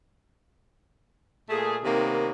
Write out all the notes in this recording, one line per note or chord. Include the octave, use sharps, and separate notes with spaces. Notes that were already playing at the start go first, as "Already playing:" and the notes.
A#2 A3 G#4
C3 D#3 A#3 B3 C#4